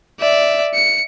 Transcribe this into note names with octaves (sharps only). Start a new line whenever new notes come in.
D5 E5
C#7